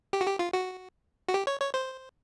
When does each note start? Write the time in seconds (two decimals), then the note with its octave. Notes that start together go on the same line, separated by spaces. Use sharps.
0.13 G4
0.21 F#4
0.27 G4
0.39 F4
0.53 F#4
1.29 F#4
1.34 G4
1.47 C#5
1.60 C#5
1.74 C5